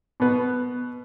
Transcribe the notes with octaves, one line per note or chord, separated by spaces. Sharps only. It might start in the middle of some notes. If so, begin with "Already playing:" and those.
B2 B3